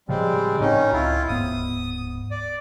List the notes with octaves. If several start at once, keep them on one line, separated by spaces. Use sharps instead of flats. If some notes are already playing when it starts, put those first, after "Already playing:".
A2 C#3 F3 G3 G#3 C4
A2 D#3 C4 C#4 D#4
C#2 E4 F4
D1 G#2 B3 D#6
D5